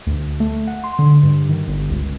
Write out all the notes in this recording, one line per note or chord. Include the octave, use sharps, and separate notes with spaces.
D2
A3
F#5
C6
D3
G2
D#3
G1
C#2